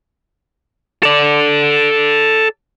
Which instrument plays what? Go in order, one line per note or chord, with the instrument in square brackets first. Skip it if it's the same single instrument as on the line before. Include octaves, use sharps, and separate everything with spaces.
[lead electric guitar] A4 D5